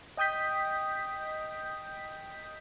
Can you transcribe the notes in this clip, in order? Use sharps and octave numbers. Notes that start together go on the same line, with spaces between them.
D#5 G5 D#6 G6 B6